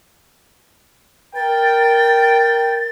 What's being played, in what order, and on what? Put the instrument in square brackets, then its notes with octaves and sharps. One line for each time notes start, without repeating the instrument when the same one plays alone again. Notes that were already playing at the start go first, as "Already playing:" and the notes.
[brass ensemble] A#4 G5 [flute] A6